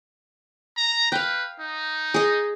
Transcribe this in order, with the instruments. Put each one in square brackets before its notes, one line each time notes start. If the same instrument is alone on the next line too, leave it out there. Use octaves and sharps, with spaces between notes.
[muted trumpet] A#5
[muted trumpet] B4 [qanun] F5 G5
[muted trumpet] D#4
[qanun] G#4 D#5